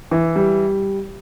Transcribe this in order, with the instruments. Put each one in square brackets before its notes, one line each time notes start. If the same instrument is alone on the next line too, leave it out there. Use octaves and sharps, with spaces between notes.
[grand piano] E3
G3